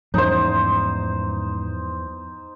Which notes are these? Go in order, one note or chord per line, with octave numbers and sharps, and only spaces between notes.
E2 G#2 F3 G3 C#4 D#4 C5